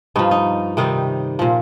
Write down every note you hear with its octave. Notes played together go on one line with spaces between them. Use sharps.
G2 F3 D#4
D#4
C3 D#3 G3 D#4
A#2 F3